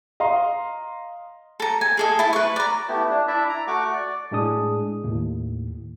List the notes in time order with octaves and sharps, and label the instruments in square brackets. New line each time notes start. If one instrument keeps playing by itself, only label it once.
[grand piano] D#5 F5 A#5 C6
[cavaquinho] A4 A#5
G#5
G#4 A4 D#5
E4 A5
B4 C#6
D5 A#5
[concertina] A3 B3 E4 G4
D4
D4 E4 D5 E5
A#5
A3 F#4 F#5 C#6 D6
D5
[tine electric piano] A2 G#3 D4 G#4 D#6
D#2 A2